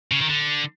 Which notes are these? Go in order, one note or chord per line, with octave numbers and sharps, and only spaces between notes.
C#3
D#3
D3